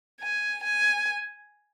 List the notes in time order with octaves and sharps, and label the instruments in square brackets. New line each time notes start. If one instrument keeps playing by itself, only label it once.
[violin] G#5
G#5